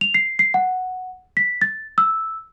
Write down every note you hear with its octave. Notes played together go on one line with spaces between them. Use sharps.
F7
C7
C7
F#5
B6
A6
E6